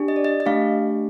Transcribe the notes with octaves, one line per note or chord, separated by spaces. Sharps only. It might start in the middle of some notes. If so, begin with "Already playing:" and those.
Already playing: D4 G4
D#5
D5
D#5
D#5
A3 D4 G4 F5